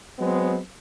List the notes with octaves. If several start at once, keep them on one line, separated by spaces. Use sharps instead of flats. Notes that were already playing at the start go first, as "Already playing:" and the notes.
F#3 G#3 B3 C4